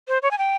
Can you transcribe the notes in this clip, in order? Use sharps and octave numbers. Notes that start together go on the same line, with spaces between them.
C5
C#5
G#5
G5